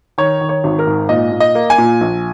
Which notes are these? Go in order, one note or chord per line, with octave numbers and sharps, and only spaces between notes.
D#3 C#5
D#3
C#5
G#1
A#4
G#2
A#2 D#5
A#2
D#5
A#3
G#5
A#2
A#1